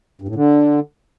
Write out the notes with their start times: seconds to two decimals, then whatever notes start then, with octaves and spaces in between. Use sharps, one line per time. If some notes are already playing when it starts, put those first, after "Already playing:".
0.22 G2
0.28 A2
0.35 D3